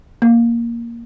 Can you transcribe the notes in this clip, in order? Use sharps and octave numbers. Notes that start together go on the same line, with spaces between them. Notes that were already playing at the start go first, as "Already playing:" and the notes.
A#3